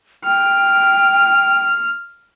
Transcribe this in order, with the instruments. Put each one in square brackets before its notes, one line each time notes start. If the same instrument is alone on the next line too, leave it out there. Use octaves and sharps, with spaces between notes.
[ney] G5 [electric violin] F6